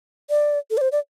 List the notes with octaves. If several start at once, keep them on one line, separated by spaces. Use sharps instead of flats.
D5
A4
D5
C5
D5